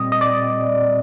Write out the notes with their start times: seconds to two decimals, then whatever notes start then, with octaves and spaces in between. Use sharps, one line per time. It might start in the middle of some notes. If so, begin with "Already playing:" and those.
Already playing: A#2 G3 C4 D#5
0.12 D#5
0.21 D5